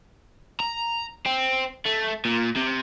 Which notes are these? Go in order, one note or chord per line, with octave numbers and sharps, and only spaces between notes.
A#5
C4
A3
A#2
C3